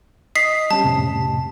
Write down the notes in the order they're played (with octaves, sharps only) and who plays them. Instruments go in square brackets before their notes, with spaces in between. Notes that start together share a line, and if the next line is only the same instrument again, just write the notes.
[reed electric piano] D#5 D#6 [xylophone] B6 C7
[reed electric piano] G3 C#4 G4 [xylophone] A5
[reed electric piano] F2 A2 C3